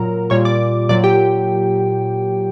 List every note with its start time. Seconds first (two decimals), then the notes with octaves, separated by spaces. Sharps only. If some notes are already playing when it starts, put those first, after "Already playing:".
Already playing: A#2 F#3 A#4 A#5
0.30 A#2 G3 C#5 C#6
0.45 D5 D6
0.89 A#2 F#3 D5 D6
1.04 G4 G5